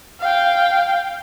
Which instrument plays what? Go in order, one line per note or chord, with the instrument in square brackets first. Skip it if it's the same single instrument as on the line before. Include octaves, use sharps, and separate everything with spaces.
[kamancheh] F5 G5